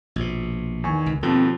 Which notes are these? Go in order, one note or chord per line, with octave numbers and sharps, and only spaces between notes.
A#1 B2
E2 D#3 G#5 C#6
C#2
D#2 B2 F3 C4 A4